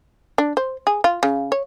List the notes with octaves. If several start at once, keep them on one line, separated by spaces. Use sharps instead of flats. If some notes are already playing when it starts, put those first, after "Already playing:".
D4
C5
G#4
F4
C#3
C#5